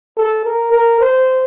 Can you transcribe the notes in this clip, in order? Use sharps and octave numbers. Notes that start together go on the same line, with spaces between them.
A4
A#4
A#4
C5